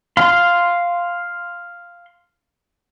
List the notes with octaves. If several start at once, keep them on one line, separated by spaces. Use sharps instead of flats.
F5 C6